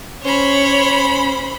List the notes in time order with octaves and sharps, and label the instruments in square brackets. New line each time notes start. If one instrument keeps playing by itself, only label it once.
[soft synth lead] C#4 [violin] C5 B5 [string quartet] C#5